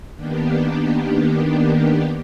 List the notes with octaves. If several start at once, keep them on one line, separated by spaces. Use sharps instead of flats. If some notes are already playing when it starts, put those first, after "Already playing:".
D#3 A#3 B3 D4 G4